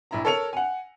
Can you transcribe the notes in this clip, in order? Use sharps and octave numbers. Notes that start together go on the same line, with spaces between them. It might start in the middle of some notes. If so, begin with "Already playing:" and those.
A#1 E4 A#5
A4 A#4 C#5 C#7 F7
F#5 G#5